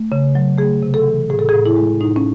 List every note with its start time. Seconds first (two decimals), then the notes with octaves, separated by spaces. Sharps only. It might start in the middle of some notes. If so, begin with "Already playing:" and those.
Already playing: A3
0.12 C#3
0.35 F#3
0.58 A3 G#4
0.83 C3
0.94 A4
1.06 E3
1.30 A2 G#4
1.39 A4
1.49 A2 G#4
1.66 E4
1.76 G#3
2.01 A2 D#4
2.16 C#4